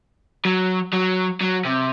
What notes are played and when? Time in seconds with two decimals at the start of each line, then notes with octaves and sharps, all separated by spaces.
0.45 F#3
0.93 F#3
1.41 F#3
1.65 C3